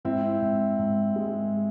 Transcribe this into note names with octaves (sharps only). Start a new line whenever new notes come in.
G#2 C4 E4
G#2
G#2
G#3